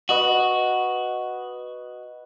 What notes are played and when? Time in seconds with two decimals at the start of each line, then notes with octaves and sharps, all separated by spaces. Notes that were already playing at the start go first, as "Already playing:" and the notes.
0.09 F#4 B4 D#5 F#5